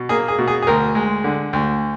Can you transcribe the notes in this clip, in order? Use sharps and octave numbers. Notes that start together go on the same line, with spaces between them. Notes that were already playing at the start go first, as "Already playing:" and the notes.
Already playing: B2
A#3 G#4
G#4
B2
G#4
G#4
D2 A#4
G#3
D3
D2